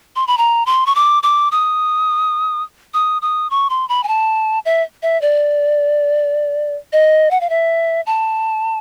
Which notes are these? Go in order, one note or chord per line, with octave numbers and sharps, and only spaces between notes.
C6
B5
A#5
C6
C#6
D6
D6
D#6
D#6
D#6
C#6
C6
B5
G#5
A5
E5
E5
D5
D#5
F#5
F5
E5
A5